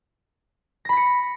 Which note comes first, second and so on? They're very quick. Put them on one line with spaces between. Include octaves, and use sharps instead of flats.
A#6 B5 B6 C#7